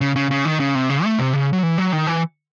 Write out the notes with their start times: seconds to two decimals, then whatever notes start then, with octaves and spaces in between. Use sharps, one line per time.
0.01 C#3
0.16 C#3
0.31 C#3
0.45 D#3
0.60 C#3
0.75 C3
0.90 C#3
1.04 A3
1.19 C3
1.33 C#3
1.53 F#3
1.63 E3
1.78 F#3
1.93 D#3
2.07 E3